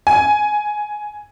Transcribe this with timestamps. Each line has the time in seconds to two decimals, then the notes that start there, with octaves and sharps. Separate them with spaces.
0.07 G#5